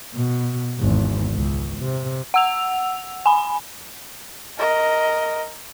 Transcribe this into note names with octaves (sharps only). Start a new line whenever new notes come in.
B2
G#1 E2
C#2
C3
F#5 E6 F7
G#5 B5
A#4 D#5